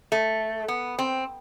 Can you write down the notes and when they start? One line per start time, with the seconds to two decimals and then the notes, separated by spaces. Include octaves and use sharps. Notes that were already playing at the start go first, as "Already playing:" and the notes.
0.12 A3
0.68 B3
0.99 C4